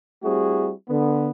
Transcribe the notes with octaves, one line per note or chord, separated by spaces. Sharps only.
G3 A3 C4 E4 F#4 G#4
D3 B3